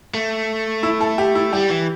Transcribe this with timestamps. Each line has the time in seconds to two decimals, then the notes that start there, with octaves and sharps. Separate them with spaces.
0.14 A3
0.83 E4
1.01 A4
1.18 G4
1.35 E4
1.53 G3 G4
1.70 E3